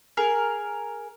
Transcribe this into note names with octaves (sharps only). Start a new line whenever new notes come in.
G#4 A#4